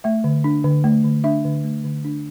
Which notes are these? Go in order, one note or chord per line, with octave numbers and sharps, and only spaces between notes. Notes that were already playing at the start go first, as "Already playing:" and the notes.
A3 E5
D3
D4
D3
A3
D3
D4 E5
D3
A3
D3
D4